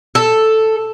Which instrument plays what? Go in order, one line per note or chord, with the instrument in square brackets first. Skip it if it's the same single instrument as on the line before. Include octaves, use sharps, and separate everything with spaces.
[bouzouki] A4